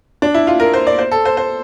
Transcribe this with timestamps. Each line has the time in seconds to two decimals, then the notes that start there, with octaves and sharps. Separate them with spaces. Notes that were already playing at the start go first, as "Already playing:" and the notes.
0.22 D4
0.34 E4
0.47 F4
0.60 A#4
0.74 C5
0.87 D5
0.99 C5
1.11 A4
1.25 C5
1.37 C5